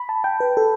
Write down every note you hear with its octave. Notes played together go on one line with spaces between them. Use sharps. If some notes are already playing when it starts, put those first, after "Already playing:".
Already playing: B5
A5
G5
B4
A4